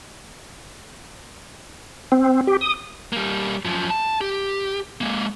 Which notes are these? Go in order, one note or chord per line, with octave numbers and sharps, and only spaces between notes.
C4
G4
D#6
G3 A#3
F#2 F3
A5
G4
G#3 A#3